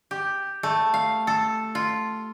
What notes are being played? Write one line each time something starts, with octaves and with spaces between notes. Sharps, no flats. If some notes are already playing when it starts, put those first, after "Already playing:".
G4
A3
F5
A4
F4